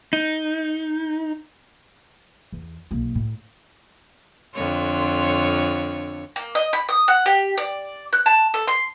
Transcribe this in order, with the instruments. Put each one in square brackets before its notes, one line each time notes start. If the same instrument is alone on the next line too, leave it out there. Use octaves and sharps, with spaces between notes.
[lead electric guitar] D#4
[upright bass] E2
B1 A#3
A2
[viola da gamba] F2 D3 C#5
[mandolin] A#3
D#5
B5
D#6
F#5
G4
D5
F#6
A5
A4
C6